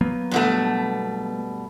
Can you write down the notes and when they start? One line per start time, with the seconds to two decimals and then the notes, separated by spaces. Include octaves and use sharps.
0.01 F#3 A#3 B3
0.31 G2 B2 A3